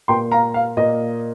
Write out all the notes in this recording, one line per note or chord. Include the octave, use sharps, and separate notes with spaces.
A#2 A#3 G5 C6
F5 A#5
F5
A#2 A#3 D#5